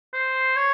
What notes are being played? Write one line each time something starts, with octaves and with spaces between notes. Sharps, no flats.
C5
C#5